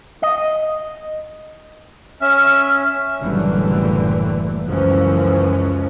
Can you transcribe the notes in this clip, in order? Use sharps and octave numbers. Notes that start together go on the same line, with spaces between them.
D#5
C#4 E5 F6
F#1 A2 D3 E3 F#3 G3
C#2 F#2 E3 F3 C#4